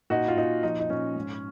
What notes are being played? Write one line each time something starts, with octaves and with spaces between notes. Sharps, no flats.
A#2 D#4 F#4
F4
A#2 D#4
F3 D#4
D#4
A#2 C#4
G#2